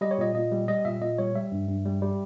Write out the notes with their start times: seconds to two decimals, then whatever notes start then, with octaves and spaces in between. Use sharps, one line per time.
0.01 G3 D#5
0.11 C#5
0.18 A#2 D#5
0.35 A#2 D#5
0.52 G3
0.68 G3 D#5
0.85 A#2 E5
1.01 A#2 D#5
1.18 G3 C#5
1.35 G3 E5
1.52 G2
1.68 G2
1.85 G3
2.02 G3